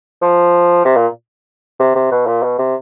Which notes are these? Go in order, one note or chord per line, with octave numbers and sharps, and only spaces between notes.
F3
C3
A#2
C3
C3
B2
A#2
B2
C3